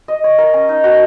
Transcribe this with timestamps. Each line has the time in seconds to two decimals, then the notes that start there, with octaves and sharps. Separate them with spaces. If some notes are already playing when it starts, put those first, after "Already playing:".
0.08 D#5
0.24 C#5
0.38 A#4
0.54 C#4
0.69 D#4
0.84 F#4